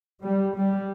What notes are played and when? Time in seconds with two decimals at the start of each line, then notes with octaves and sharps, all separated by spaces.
0.23 G3
0.55 G3